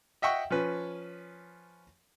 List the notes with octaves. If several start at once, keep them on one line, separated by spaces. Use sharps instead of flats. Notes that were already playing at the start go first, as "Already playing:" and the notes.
D#5 E5 F#5 G5 C#6
F3 C#4 B4